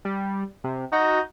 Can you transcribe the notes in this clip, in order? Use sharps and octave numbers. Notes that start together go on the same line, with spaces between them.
G3
C3
D#4 F#4